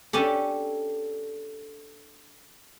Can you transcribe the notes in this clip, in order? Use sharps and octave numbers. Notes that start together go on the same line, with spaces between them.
C#4 D4 G4 A4